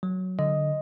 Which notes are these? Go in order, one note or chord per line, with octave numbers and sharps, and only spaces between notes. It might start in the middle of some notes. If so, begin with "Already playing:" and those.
F#3
D3 D#5